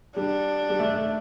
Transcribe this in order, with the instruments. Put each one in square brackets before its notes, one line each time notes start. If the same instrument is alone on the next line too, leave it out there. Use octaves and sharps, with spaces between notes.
[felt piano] G3 [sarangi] D4
[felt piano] G3
A3
A3